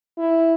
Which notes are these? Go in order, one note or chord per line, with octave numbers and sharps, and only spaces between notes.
E4